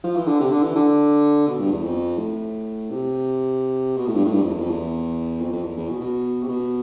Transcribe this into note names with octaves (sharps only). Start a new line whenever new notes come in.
F3
E3
D3
C3
D3
E3
D3
B2
G2
E2
F2
A2
C3
B2
A2
G2
A2
G2
F2
E2
F2
E2
F2
F2
E2
E2
B2
B2
C3
B2